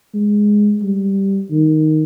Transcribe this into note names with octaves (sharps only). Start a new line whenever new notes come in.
G#3
G3
D#3